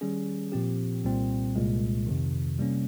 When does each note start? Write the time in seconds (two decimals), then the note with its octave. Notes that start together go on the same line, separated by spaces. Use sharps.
0.01 D#3 G3 C#4 G#4
0.52 A#2 F3 C4 G4
1.04 C2 A#2 G3 C4
1.56 C2 A#2 G#3
2.07 F2 C3 D#3
2.58 C3 G3 A#3 C#4